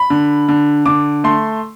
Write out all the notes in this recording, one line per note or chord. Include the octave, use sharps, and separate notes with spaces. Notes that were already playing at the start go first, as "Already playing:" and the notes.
Already playing: B5
D3
D3
D3 D6
A3 C6